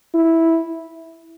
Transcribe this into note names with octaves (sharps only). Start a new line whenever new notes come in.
E4